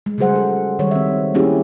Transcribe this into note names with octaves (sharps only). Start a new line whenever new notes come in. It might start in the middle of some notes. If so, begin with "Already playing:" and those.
G#3
C#3 F#3 G3 G#4 C5 F#5
A4
D#3 G3 C#5
C4 E5
A#3 C#4 E4 G4 G#4